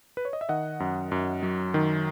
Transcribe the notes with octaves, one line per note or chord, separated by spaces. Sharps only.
B4
C#5
D#5
E5
D#3 D#5 F#5
F#2
F#2
F#3
D#3